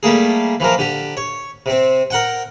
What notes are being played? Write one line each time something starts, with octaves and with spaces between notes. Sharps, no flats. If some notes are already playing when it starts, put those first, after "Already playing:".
G3 A3 A#3 G#4
E3 F3 A#4
D3 G4
C#5
C3 C4
A#4 F#5 G5